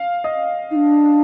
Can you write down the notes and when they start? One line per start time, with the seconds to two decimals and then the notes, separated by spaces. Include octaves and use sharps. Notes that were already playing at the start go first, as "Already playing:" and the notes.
Already playing: F5
0.24 D#5
0.71 D#4
0.75 D4